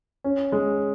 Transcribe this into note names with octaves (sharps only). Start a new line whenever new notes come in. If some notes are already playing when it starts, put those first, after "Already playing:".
C#4
G#3